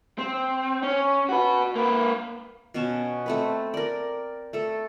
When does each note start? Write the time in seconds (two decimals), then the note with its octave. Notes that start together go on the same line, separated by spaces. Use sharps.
0.18 C4
0.83 C#4
1.29 F#4 B4
1.76 A#3 B4
2.74 B2 C#4 A5
3.26 A3 C4 B4
3.74 A#4 D5
4.53 A3 A4